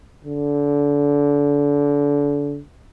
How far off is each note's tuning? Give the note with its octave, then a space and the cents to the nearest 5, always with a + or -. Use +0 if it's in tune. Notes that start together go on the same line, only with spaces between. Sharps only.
D3 -30